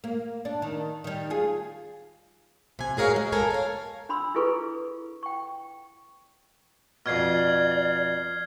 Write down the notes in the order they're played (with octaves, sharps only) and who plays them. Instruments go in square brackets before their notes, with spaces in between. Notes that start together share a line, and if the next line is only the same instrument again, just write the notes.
[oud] A#3
D4
D#3
D#3 G3
F4 G#4
[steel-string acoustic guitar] C3 G#5
F#4 G#4 A#4 C#5 F5
G#3
A4 A#4 G#5
C#5 F5
[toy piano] D4 B5 C6 E6
E4 F4 G#4 A4 B4 C#6
G5 C#6
[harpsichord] F2 B2 [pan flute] D5 [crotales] F6 G#6 C7